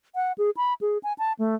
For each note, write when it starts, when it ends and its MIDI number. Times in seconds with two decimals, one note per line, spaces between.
0.15 0.32 78
0.38 0.50 68
0.57 0.74 83
0.81 0.98 68
1.03 1.13 80
1.19 1.33 81
1.39 1.55 57